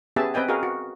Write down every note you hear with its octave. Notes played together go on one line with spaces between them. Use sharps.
B3 C#4 G4 G#4 E5 A5
C4 B4 D#5 G5 G#5
F#4 G#4 A#4 D#5 F5
F#4